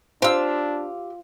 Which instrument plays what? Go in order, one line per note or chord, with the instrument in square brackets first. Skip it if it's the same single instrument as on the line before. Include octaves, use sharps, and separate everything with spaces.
[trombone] D4 [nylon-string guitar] F4 F5 [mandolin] G4 E6 [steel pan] C5